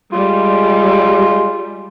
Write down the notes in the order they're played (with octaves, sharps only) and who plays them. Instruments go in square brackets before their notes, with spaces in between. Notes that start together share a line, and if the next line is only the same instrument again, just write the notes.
[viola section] G3 [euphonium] G#3 [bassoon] F4